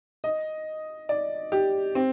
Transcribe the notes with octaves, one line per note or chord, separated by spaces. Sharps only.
D#5
D5
G4
C4